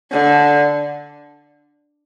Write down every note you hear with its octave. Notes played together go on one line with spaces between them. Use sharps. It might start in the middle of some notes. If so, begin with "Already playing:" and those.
D3